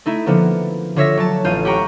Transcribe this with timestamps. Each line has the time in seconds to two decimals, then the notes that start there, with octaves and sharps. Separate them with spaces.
0.06 A3 D#4 E4
0.26 D3 F3 A#3 B3
0.96 D3 F4 C#5 E5 E6 A#6
1.17 F#3 A5
1.45 A1 F4 G6 D#7
1.65 G4 F#5 G5 A#5 C#6